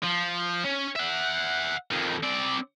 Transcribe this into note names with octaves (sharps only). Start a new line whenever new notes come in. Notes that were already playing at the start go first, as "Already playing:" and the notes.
F3
C#4
E5 F#5
F2 D#3
C4 D5